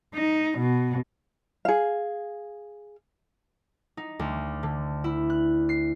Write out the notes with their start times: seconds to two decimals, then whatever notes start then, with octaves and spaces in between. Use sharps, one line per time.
0.14 D#4
0.58 B2
1.65 G#4 F5
3.97 D#4
4.19 D2
4.63 D3
5.04 E4
5.30 F#6
5.69 C7